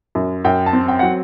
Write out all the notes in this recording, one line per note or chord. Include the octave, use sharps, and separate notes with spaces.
F#2
F#2 G5
A5
C4
G5
F#3 F#5